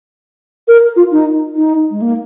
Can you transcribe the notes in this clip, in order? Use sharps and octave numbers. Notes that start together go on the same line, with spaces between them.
A#4
F4
D#4
D#4
G#3
A#3